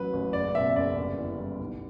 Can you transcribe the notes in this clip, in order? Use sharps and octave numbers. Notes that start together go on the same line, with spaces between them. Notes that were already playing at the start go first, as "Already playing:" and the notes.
Already playing: A1 F#3 B4
A1
F#1 D5
B2 E5
F#1 D5
G1
E3
G3
B1